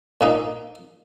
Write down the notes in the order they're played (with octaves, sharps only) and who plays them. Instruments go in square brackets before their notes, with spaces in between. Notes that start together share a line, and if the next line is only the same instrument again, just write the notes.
[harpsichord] A#2 A#3 D#4